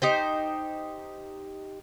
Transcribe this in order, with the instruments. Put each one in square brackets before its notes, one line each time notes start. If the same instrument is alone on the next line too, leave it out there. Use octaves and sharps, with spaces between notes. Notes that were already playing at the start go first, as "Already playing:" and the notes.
[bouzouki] D#4 G4 C5